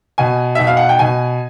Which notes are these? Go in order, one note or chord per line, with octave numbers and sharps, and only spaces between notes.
B2 G#5
B2 E5
F5
F#5
G5
B2 G#5